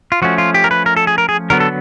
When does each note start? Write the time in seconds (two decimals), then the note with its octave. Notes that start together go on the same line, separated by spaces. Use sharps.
0.12 F4
0.22 F3 A3 C#4 F#4
0.38 F4
0.54 G4
0.64 A#4
0.71 B4
0.86 A#4
0.97 A4
1.07 G#4
1.18 A#4
1.29 G#4
1.50 D3 F#3 B3 A#4
1.60 A4